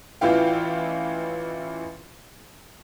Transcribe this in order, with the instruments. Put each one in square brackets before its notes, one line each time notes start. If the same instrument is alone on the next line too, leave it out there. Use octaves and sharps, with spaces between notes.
[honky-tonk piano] A1 E3 E4 F4 F5 G5